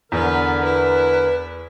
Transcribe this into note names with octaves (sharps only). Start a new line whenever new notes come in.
E2 D3 B3 A#4 B4
E4 B4